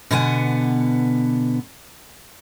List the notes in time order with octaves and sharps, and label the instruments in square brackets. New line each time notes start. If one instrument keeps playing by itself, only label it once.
[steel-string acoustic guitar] B2 D3 B3 F#5 G#5